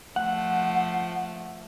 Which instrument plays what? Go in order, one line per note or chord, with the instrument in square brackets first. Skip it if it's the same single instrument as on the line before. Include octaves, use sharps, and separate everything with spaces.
[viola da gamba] F3 A3 [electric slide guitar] F#5